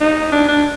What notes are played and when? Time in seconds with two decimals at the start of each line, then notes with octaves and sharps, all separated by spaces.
0.01 D#4
0.32 D4
0.49 D4